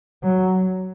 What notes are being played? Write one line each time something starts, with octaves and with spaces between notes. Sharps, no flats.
F#3